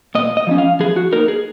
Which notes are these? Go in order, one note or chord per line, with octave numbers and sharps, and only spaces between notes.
A#2 D#5
D#5
F3 A#3 C#4
F5
F3 G#4
F#4
A#3 D#4 A#4
G#4